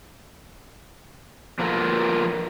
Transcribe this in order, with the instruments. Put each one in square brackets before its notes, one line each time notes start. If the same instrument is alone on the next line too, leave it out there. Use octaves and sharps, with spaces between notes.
[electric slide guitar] F3 A#3 B3 F4 A4 A#4